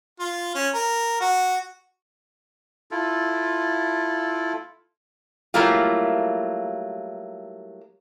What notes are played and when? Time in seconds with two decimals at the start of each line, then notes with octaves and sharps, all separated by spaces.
0.20 F4
0.55 C#4
0.74 A#4
1.21 F#4
2.91 E4 F4 A4
5.54 F#3 G3 A3 A#3 E4 F4